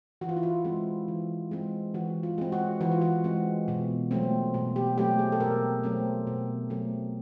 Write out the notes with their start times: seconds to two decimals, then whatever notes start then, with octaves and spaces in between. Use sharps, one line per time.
0.21 E3 F#4
0.29 F4
0.37 E4
0.43 F4
0.65 G#3 C4
1.08 E3
1.51 G#3 C4
1.94 E3 F#4
2.23 F4
2.38 G#3 C4
2.52 F#4
2.81 E3 F#4
2.92 F4
3.02 F#4
3.24 G#3 C4
3.68 B2
4.11 F#3 A3 C4
4.54 B2
4.76 G4
4.98 F#3 A3 C4 G4
5.19 G#4
5.32 A4
5.40 B2 A#4
5.84 F#3 A3 C4
6.27 B2
6.70 F#3 A3 C4